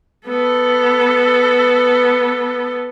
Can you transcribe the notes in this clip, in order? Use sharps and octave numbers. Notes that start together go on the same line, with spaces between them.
B3 A4